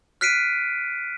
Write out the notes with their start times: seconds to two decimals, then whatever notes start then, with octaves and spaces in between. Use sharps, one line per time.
0.21 F6 F#6 B6 C7 D7 D#7